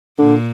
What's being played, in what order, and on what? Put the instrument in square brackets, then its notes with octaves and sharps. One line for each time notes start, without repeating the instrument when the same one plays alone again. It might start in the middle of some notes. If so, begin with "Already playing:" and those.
[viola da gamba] A#2 [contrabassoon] D3